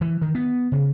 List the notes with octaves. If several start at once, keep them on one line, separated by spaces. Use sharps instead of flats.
E3
D#3
B3
C#3